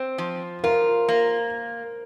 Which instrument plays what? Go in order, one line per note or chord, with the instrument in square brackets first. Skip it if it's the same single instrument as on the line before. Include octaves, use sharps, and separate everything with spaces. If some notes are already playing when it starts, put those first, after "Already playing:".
Already playing: [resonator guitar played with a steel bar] C4 [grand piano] C5
[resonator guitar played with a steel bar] F3
[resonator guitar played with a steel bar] F4 [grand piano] A#4
[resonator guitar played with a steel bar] A#3